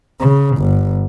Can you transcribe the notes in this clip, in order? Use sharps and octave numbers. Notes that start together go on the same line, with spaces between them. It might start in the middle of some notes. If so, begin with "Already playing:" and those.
C#3
G1